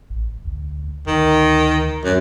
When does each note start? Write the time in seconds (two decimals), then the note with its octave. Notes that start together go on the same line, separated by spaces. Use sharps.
0.10 A1
0.45 D2
1.07 D2 D#3
2.04 F#2